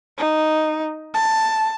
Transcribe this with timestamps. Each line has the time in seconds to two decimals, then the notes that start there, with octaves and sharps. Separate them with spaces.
0.18 D#4
1.14 A5